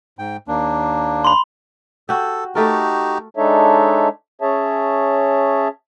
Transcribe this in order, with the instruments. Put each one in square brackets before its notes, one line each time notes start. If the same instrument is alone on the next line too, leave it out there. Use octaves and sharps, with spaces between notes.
[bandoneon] G#2 G5
D#2 A#3 D4
[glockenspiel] B5 C6
[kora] F#4 G4 [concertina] A4
[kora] A3 A4 A#4 [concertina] D#4 F#4 G4
[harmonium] G#3 D4 D#4 A4 C#5 E5
C#4 G#4 C#5 E5 A5